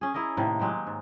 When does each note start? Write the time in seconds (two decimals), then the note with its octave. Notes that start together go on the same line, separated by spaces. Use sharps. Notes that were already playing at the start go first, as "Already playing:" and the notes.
0.01 C#4 G#4
0.14 E4 G#4 A#4 D#5
0.37 A2 C3 D#3 A#3
0.59 F#3 G#3 G4 C5
0.87 G#2